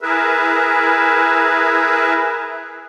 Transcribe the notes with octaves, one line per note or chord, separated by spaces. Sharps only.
E4 G#4 A#4 B4 E5